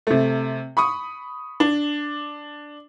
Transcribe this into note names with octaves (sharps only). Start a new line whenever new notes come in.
C3 A3
B5 C#6 D#6
D4